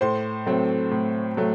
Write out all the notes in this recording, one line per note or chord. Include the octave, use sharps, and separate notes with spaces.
A2 C5 C6
F#3 A3 C4
A2
F#3 A3